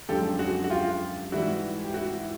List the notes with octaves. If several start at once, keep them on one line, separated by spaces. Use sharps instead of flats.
F#2 D3 F3 G#3 G4 A4
F#4 G#4
F#4
F4 G4
G#2 E3 G3 E4 F#4
G4
E4 F#4
E4